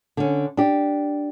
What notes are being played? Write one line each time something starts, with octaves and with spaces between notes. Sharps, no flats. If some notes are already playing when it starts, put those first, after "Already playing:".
D3 C#4
D4 G4